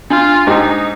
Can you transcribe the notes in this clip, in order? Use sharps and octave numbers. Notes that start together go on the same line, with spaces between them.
D4 F4
G#2 D#4 G4